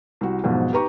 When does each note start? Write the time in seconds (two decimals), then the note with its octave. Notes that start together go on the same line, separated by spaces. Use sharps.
0.21 C2 F#4
0.44 B1 F2 G#2 B2
0.72 D#4 G4 B4 A#5 C#6